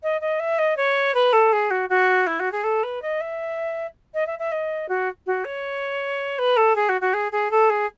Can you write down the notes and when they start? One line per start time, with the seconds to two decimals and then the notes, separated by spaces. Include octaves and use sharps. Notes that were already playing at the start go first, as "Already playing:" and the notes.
0.03 D#5
0.21 D#5
0.40 E5
0.59 D#5
0.77 C#5
1.14 B4
1.33 A4
1.53 G#4
1.71 F#4
1.89 F#4
2.27 E4
2.40 F#4
2.52 G#4
2.64 A4
2.83 B4
3.02 D#5
3.21 E5
4.14 D#5
4.27 E5
4.39 E5
4.52 D#5
4.89 F#4
5.26 F#4
5.45 C#5
6.39 B4
6.57 A4
6.76 G#4
6.89 F#4
7.01 F#4
7.14 G#4
7.32 G#4
7.51 A4
7.70 G#4